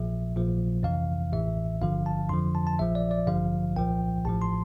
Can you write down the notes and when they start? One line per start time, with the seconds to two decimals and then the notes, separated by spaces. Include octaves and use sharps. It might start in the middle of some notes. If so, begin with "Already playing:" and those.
Already playing: A#1 A#2 F3 E5
0.35 A#1 A#2 F3
0.83 F2 C3 E3 F5
1.32 A1 A2 E3 E5
1.81 G1 G2 D3 F3 F5
2.06 A5
2.29 F2 D3 F3 C6
2.55 A5
2.67 A5
2.79 A#1 A#2 F3 E5
2.95 D5
3.11 D5
3.27 A1 G2 D3 F3 F5
3.76 C2 A#2 F3 G5
4.25 A1 A2 F3 A5
4.42 C6